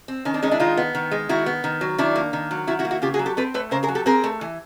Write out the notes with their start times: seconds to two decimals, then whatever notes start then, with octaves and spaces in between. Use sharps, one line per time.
0.08 C4
0.25 D#3 C#4
0.34 C4 D4
0.42 G#3 C#4 D#4
0.51 D4 E4
0.60 D#3 D#4 F4
0.77 B3
0.95 D#3
1.11 G#3
1.29 D#3 E4 F#4
1.46 B3
1.64 D#3
1.81 F#3
1.98 D#3 D4 E4
2.16 A#3
2.33 D#3
2.51 F#3
2.67 D#3 E4 F#4
2.79 E4 F#4
2.85 A#3
2.91 E4 F#4
3.02 C#3 F4 G4
3.14 F#4 G#4
3.19 F#3
3.26 G4 A4
3.37 C4 A4 B4
3.54 A3 B4 C#5
3.71 C#3 A#4 C5
3.83 G#4 A#4
3.89 F#3
3.95 G4 A4
4.06 C4 G#4 A#4
4.24 A3
4.41 E3